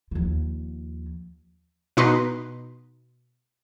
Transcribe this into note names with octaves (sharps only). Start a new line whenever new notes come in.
D#2 F3
B2 D#4 B4 C6